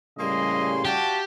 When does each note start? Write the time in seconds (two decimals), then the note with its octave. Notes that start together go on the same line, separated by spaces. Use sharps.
0.19 A2 C#3 G3 A#3 D#5 G#5 C6
0.85 F#4 G4 D5 F5 A5